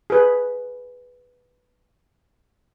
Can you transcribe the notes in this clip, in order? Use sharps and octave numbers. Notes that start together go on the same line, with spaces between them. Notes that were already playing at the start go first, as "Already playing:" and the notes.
G#4 B4